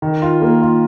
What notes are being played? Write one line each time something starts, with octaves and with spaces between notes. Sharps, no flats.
D#3
F4
A#3
F4